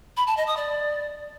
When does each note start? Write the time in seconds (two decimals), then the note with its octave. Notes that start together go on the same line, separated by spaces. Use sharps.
0.17 B5
0.27 A5
0.37 D#5
0.47 D#6
0.57 D5